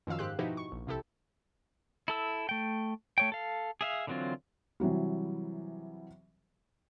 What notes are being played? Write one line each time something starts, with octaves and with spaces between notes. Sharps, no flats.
F#2 D#3 F3 F5 E6
G#2 G4 C6 F#6
B2 F3 D#4 E4 F#4 G4
C#6
A#1
C2 C3 E4 G4 A4
E4 A4 E6
A3 G5
A3 C#5 G5
A4 F5
G#4 E5 F5
D3 E3 F#3 C4 F4
C3 E3 F#3 G3